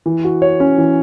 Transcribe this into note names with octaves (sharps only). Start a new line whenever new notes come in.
E3
F#4
C#5
C#4
E3